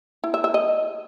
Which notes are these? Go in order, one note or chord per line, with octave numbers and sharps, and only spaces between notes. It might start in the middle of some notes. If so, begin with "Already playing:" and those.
E4
E5
E5
D#5